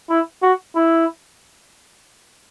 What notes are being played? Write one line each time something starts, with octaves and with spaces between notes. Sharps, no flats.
E4
F#4
E4